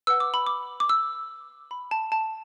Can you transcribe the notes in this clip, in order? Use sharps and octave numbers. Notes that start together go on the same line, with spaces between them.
B4 F#5 E6
D6
B5
D6
D6
E6
B5
A5
A5